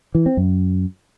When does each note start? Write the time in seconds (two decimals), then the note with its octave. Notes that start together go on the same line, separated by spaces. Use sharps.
0.15 E3
0.26 C4
0.37 F#2